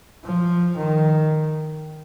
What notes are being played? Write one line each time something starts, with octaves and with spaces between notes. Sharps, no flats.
F3
D#3